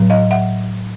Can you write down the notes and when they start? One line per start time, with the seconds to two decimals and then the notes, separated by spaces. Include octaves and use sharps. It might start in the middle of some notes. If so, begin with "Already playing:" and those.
Already playing: A2 F#3
0.10 D#5 F5
0.31 E5 F#5